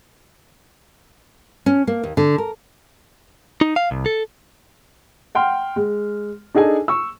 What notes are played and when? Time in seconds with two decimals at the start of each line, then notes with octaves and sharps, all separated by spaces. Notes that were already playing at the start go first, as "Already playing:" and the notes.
1.66 C#4
1.87 A#3
2.03 D#2
2.17 D3
2.38 A#4
3.61 D#4
3.76 F5
3.91 C2
4.06 A4
5.35 F#5 G5 C6 F6
5.76 G#3
6.54 D4 D#4 G#4 A4 G#5
6.88 C#6 E6